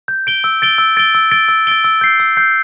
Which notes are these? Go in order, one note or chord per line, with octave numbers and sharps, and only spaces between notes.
G6
D7 G7
E6
A6 D7 G7
E6
A6 D7 G7
E6
A6 D7 G7
E6
A6 D7 G7
E6
G6 C7
E6
G6 C7